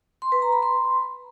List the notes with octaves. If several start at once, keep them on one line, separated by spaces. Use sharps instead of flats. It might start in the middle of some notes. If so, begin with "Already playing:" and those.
C6
B4
A#5
B5
C6